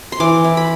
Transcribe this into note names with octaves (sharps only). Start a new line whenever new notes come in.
C6
E3 D6
E4
B5